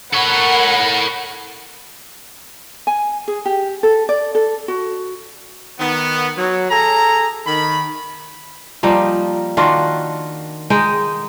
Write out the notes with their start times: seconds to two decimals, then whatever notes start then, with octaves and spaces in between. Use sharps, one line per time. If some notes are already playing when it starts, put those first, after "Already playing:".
0.14 A4 A#4 C#5 F#5 B5
2.87 G#5
3.28 G#4
3.45 G4
3.83 A4
4.09 D5
4.35 A4
4.68 F#4
5.79 D#3 B3
6.37 F#3
6.71 G#4 A4 A#5
7.47 D#3 B5
8.83 F3 G3 A#3 D#4
9.57 D#3 D4 F4 F#4
10.70 G#3 D#4 G5